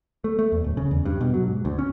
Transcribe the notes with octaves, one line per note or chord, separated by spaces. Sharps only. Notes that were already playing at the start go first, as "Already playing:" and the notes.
A3
A3
E2
D1
C#3
E2
G2
B2
F#3
G#2
D2
C#4